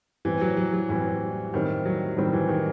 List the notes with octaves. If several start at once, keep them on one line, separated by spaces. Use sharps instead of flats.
A2 E3 G3 C4
F#3
F#3
F#3
A2 E3 G3 C4
A2 D#3 G3 C4
F#3
A2 D#3 G3 C4
E3
D#3